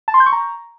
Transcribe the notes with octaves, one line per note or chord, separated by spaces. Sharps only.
A5
C6
G6
C#6
A#5